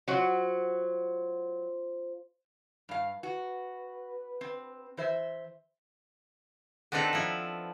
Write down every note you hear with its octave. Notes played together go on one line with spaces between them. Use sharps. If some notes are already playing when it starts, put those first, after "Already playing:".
F#3 F4 F#4 C5
G2 F5
F#4 B4
C4
E3 C5 E5
B3 C4 D4 D#4 A4 B4
F3 E4